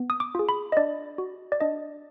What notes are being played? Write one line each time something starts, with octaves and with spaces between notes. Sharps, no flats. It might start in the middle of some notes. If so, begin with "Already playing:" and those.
Already playing: B3
D#6
D6
F4 G#4
B5
D#5
D4 D5
F#4
D5
D4 D#5